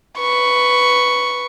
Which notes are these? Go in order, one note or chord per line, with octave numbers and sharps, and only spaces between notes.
B4 C#6